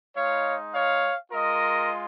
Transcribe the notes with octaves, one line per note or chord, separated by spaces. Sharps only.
G#3 D#4 C#5 F5
C#5 F5
G#3 F4 A#4 D#5